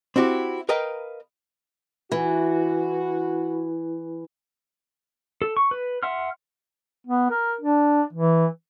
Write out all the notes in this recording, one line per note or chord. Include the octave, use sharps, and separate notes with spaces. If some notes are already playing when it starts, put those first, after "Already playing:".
C4 E4 F#4 G4
A#4 B4 D#5 F5 G5 A#5
E3 F#4
A4
C#6
B4
E5 F#5 C6 F6
B3
A#4
D4
E3